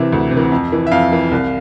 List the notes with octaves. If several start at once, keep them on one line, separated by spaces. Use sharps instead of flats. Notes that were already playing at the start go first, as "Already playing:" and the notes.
Already playing: C3 E3 E5
D2
C3
E3
F2
E3
E5
F2 F5
E3
C2